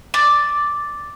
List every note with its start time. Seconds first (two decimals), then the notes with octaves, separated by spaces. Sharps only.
0.14 D5